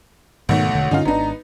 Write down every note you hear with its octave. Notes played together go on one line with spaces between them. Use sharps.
B1 G#2 D#3 A3 B3 F#5
E1 D3
G2 D3 C#4 D#4 F4
G#1 C#3 B3 D4 D#4 A#5